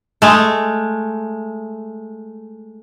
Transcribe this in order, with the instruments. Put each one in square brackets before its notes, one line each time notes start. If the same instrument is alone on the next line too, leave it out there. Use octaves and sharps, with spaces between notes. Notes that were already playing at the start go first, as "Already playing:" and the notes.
[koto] G#3 A3